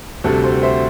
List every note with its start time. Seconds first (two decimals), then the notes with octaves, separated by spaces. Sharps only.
0.24 D2 C3 G3 F#4 A4
0.43 A4 C5
0.63 C5 E5